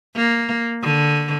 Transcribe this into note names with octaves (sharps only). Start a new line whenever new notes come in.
A#3
D3